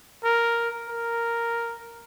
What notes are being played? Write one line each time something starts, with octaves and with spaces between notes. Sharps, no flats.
A#4
A#4